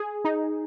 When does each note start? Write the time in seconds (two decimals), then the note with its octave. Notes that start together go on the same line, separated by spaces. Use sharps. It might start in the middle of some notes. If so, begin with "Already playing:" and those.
Already playing: G#4
0.25 D#4